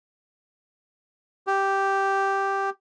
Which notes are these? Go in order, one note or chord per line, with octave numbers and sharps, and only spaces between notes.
G4